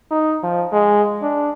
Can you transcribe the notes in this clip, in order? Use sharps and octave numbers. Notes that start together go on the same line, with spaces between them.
D#4
F3
G#3
D4